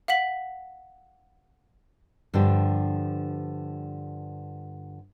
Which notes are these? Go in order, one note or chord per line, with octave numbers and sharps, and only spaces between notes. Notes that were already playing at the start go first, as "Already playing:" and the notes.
F5 F#5 B6 F#7
G2 D3 F3 D4 G4